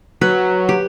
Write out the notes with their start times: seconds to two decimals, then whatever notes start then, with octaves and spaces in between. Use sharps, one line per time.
0.21 F#3 B4
0.69 G4